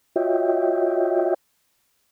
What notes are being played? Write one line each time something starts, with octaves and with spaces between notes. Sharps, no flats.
F4 F#4 C#5 D#5 E5 G5